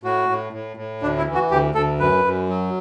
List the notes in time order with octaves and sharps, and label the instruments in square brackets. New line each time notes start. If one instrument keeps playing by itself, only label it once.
[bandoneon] A2 F#4
A2
A2
A2
D2 D4
E4
E3
F#4
D2 G4
D2 A4
F#2 B4
F#2
F#3